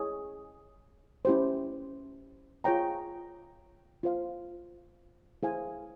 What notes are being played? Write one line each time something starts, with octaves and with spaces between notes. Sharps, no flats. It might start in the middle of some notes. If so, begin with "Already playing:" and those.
Already playing: E4 G#4 C#5
C#4 E4 G4 C5
F4 G#4 C#5 G5 A#5
F4 C5 F5
E4 G#4 C5 F5 G#5